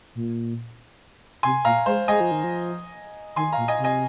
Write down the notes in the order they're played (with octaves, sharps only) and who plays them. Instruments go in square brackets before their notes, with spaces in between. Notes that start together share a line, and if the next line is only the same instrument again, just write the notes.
[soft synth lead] A#2
[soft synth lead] C3 [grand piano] G#5 C6
[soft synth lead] A#2 [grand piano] F5 A#5
[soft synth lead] G#3 [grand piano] C5 F5
[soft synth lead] G#3 [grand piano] D#5 G#5
[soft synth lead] F3
D#3
F3
[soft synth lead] D#3 [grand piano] G#5 C6
[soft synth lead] A#2 [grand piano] F5 A#5
[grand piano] D#5 G#5
[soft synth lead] C3
[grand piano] D#5 G#5